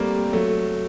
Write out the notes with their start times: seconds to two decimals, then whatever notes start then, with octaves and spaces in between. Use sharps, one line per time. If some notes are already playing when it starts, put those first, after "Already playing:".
Already playing: G3 A3 A#3 C4
0.33 F#3 A3